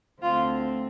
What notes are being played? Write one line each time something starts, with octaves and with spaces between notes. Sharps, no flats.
D2 D3 A3 C4 F4